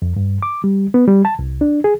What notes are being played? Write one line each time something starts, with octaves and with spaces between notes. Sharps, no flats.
F2
G2
D6
G3
B3
G3
A5
C2
D4
G#4